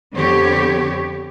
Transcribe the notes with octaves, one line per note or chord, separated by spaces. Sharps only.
F2 D3 B3 C4 G4 C#5